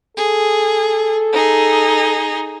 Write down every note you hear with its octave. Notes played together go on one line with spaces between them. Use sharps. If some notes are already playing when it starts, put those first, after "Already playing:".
G#4 A4
D#4 G#4